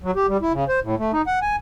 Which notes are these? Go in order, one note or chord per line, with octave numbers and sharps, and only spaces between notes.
F#3
G4
G3
E4
C#3
C5
A2
A3
D#4
F#5
G#5